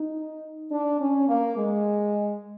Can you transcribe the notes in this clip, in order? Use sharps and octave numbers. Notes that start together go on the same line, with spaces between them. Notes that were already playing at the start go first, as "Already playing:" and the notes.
Already playing: D#4
D4
C#4
A#3
G#3